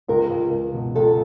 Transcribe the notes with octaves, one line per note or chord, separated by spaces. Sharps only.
C#2 A#4
C#2
C#2
B2
C#2 A4